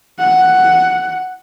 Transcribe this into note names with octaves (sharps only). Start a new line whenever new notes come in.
F#5